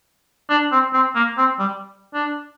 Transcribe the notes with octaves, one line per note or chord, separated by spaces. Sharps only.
D4
C4
C4
A#3
C4
G3
D4